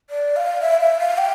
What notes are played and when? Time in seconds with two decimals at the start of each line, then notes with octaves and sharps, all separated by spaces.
0.10 D5
0.36 F5
0.61 E5
0.81 E5
0.99 F5
1.18 G5